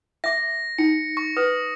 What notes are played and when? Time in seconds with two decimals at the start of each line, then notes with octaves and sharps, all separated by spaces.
0.24 E5 D6 A#6
0.78 D#4 C#7
1.17 C#6
1.37 B4 D#6